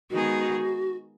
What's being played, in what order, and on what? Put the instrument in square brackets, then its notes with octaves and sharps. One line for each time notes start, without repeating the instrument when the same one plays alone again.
[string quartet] D#3 G#3 B3 D#4 G#4 [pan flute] F#4